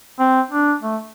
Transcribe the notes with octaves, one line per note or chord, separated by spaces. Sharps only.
C4
D4
A3